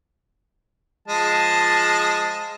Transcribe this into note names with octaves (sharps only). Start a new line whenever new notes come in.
F3 G#3 A5